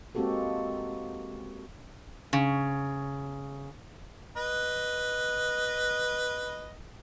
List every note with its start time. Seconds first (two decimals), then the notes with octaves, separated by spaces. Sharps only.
0.15 G#3 A#3 C4 F#4 G4 A4
2.33 C#3
4.37 B4 D#5